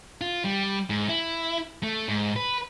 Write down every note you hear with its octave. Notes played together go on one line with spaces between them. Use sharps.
F4
G3
G#2
E4
A3
G#2
B4